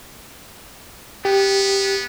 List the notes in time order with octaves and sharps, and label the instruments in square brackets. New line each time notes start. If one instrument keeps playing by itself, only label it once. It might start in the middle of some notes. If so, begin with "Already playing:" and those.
[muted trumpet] B3 [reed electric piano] G4